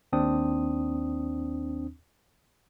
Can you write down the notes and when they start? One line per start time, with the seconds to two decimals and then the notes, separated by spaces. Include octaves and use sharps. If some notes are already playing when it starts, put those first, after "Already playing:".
0.13 D#2 C4 D4 D#6